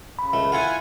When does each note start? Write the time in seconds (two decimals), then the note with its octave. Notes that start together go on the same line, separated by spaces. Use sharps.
0.19 C#3 B5
0.33 C#2 A3
0.52 E4 F4 F5 F#5 G#5